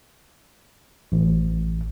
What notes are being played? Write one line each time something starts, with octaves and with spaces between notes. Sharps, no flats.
A1